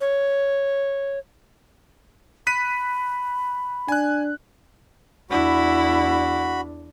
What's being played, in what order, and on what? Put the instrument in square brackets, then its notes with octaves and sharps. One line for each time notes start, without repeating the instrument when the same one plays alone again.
[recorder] C#5
[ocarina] B5 [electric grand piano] F#6 B6 D#7
[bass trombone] D4 [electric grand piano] G#5 F#6
[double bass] E2 D4 [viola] E4 [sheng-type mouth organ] F#4 B5